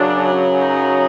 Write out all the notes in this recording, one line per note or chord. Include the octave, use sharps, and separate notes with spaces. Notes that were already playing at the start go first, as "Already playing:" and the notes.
Already playing: F#2 C#3 F#3 D4
D#4